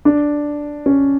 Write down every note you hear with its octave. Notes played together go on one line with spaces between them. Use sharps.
D4
C#4